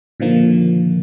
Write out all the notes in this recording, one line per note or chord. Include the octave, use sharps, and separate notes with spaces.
A#2 D3 D#3 F3 A#3